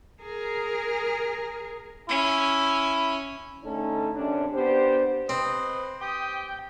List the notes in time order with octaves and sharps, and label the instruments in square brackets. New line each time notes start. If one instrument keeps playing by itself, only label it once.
[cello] G#4 A#4
[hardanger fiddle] C#4 [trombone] E4
[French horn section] D3 A3 C#4 D#4 A4
F#2 C3 C#4 D4
B3 D4 G4 C5
[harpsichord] C4 [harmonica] B4 C5 [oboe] D#5
[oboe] G4 [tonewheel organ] G5 [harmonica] D#6